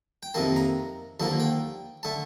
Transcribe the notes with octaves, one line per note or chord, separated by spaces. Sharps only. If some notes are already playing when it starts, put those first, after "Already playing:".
G5
F2 C3 D#3 A#3 A5
A#5
D#2 D3 F3 A#3 A5
G5
D3 A3 A5